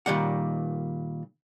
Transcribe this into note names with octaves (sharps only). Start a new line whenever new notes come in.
A#2 D#3 G3 D5 F#5